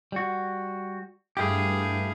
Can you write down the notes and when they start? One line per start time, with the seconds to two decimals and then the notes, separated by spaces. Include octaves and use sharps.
0.12 G3 F#4
1.37 G2 A3 E4 G4 G#4 F5